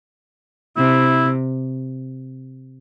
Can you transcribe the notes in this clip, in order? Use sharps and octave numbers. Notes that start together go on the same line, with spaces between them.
C3 E4